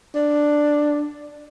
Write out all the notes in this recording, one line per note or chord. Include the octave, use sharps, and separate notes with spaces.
D4